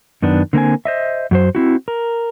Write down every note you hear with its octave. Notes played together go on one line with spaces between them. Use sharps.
F#2 D#3 B3 D4
D3 A#3 C4 G#5
C5 D#5 E5
F#2 F#3 C5
C4 E4 F#4
A#4